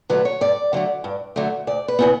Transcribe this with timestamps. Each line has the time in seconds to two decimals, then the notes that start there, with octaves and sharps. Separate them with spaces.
0.09 D3 F#3 A3 B4
0.25 C#5
0.41 G2 D5
0.73 D3 F#3 A3
1.04 G2
1.36 D3 F#3 A3
1.67 D2 D5
1.88 B4
1.99 C#3 E3 B3